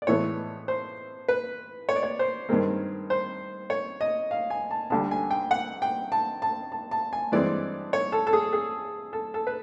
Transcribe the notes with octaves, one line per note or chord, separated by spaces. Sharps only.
D5
A2 E3 G#3 B3 C#5
C5
B4
C#5
D5
C#5
C5
G2 D#3 G#3 C4 A#4
C5
C#5
D#5
F5
G#5
A5
D2 D3 G3 A5
G#5
G5
F#5
G5
A5
A5
A5
A5
G#5
G2 E3 G#3 C4 D5
C#5
A4
A4
G#4
G#4
A4
A4
B4